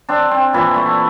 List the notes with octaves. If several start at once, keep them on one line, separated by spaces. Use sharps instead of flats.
C4 D4
C4
A#2 E3 E4
A3